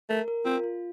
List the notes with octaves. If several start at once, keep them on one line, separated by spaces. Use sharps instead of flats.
A3 A#4
A#4
C4 F4
F4